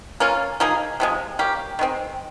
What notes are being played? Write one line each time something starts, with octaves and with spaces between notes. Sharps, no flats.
A#3 C#4 F4
F3 A#3 D#4 G#4
C3 F3 G#3
A#3 C#4 G4
D#3 G#3 C4